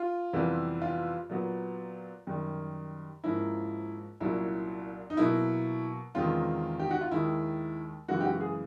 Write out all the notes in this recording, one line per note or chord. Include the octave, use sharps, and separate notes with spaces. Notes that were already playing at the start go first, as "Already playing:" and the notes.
Already playing: F4
F2 C3 E3 G3 B3
F4
A#2 F#3 B3
F#2 D#3 G3
G#2 F3 A#3 C#4 E4
C2 A#2 F#3 A#3 C#4 E4
D#4
B2 F#3 A#3 E4
E2 C3 D#3 G#3 C#4 F4
G4
F#4
F4
D#2 D#3 G#3 E4
F#2 C#3 E3 G#3 F#4
G4
F#4
G#4